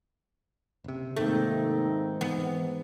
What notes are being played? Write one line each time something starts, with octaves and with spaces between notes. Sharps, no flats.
F#1 C3
G#2 C3 D#3 A3 A#3 C4 D#4
E3 B3